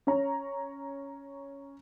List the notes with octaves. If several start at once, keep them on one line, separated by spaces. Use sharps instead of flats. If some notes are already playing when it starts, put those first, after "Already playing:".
C#4 C#5 A#5